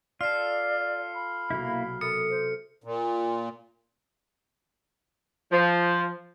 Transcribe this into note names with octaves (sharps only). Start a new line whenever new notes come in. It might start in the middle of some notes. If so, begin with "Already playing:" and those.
F4 A4 D5 F6 C7
B5
B1 C3 A#3 E4 F#4
A4 A#4 E5 D#6 C#7
C5
A#2
F3